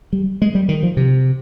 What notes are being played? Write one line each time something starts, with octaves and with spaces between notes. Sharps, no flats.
G3
G#3
G3
D#3
F3
C3